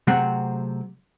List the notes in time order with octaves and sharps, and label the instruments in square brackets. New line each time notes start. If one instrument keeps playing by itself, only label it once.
[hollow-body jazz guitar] C3 F#3 A3 C4 G#4 F#5